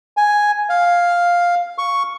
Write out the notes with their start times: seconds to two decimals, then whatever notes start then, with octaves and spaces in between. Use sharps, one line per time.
0.17 G#5
0.69 F5
1.78 C#6